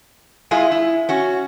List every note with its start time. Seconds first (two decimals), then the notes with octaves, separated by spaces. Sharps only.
0.51 G#3 E4 F4 G#4
0.72 E4
1.09 C#4 F#4